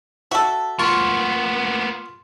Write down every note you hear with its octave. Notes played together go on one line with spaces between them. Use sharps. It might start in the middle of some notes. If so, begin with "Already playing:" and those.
F#4 A4 E5
A#3 B3 F4 C#6